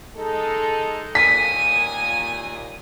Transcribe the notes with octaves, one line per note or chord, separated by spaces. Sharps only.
G#3 D#4 A4
D#2 A#2 G#5 D#6 B6